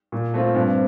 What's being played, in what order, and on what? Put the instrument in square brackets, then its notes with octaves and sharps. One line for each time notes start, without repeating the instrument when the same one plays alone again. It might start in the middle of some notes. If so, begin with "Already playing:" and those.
[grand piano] A#2
A3 C4 F4
[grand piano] G2 [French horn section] C4